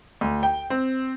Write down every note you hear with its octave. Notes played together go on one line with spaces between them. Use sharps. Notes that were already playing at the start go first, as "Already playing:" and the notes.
D2
G5
C4